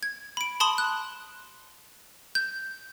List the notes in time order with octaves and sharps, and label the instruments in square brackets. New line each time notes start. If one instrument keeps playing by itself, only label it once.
[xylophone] G#6
B5 D7
A5 B5 C6 D#6 F#7
F#6
G6